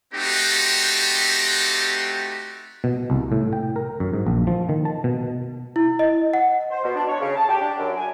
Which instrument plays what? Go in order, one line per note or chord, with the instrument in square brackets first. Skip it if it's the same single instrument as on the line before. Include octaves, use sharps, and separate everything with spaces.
[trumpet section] A3 C4 D#4 F#4 G4
[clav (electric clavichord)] B2
C2
A2
G5
A#4
F#2
G#2
A#1
F3
D#3
A5
B2
[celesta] E4
D#5
F#5
[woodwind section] C5
B2
D4
C#5
C#3
A5
G4
D4
F#2
G#5